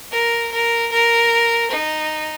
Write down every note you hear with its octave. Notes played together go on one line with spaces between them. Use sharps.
A#4
A#4
A#4
D#4